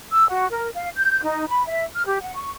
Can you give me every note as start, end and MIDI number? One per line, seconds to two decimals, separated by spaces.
0.11 0.25 88
0.29 0.47 66
0.51 0.68 70
0.74 0.89 77
0.96 1.21 91
1.23 1.45 63
1.48 1.64 83
1.67 1.84 76
1.95 2.03 89
2.06 2.18 67
2.22 2.35 78
2.36 2.53 85